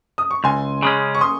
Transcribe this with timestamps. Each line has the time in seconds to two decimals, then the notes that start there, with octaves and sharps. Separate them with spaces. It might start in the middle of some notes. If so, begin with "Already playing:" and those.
0.18 D#6
0.31 C#6
0.44 C#2 G#5 C6
0.83 C#3 G#3 C#4
1.15 C#6
1.21 C6 D#6